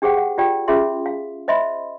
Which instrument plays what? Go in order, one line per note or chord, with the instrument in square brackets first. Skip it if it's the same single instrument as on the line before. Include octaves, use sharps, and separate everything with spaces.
[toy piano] D4 G4 G#4 C5 F#5 G5
F#5
F4 G4 D5 G5
C#4 F4 G#4 E5 C6
F5
C5 D#5 E5 B5 C6